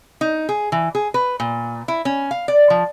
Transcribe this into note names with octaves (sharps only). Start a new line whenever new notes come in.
D#4
G#4
E3
G#4
B4
A#2
E4
C#4
F5
D5
F3